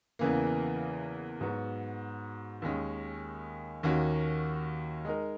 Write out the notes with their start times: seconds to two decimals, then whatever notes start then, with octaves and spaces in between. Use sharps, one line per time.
0.19 E2 C#3 E3 A#3
1.41 G#2 F#3 B3 F#4
2.62 D#2 D#3 G#3 C#4
3.83 D#2 D#3 A#3 C#4 F#4
5.05 G#3 D#4 A#4